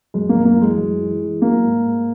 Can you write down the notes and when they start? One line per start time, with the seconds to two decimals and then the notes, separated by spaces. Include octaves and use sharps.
0.14 F#2 G#3
0.29 A#3
0.34 F#2
0.45 A#3
0.56 E3
0.62 G#3
0.77 F#2
0.99 E3
1.21 E3
1.42 F#3 A#3
1.64 G#2
1.85 G#2